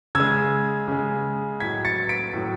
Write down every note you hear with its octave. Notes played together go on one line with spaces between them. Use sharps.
C#3 G#3 E6 G#6
C#3 G#3
A2 F#3 G#6 B6
A6 C#7
B6 D7
A2 F#3